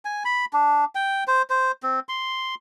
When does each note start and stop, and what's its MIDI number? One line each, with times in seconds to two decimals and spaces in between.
0.05 0.23 80
0.25 0.45 83
0.53 0.85 62
0.95 1.24 79
1.28 1.42 72
1.50 1.72 72
1.83 2.00 60
2.09 2.55 84